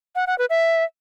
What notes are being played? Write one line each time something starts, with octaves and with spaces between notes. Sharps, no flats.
F#5
F#5
B4
E5